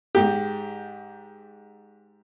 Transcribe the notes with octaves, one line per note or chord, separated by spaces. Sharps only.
G#2 G4